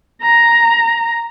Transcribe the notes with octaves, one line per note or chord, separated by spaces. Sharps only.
A#5